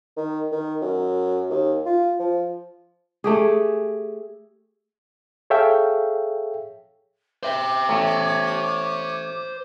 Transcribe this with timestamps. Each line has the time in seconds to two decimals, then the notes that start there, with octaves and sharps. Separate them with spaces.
0.17 D#3
0.52 D#3
0.82 F#2
1.50 D#2
1.86 F4
2.19 F3
3.24 A3 G4 G#4
5.50 G#4 A4 C#5 E5 F5 G5
7.43 C5 E5 D6
7.89 A1 A3 C#5